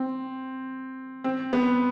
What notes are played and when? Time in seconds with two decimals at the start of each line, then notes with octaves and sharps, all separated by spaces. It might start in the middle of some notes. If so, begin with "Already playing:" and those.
Already playing: C4
1.24 C4
1.53 B3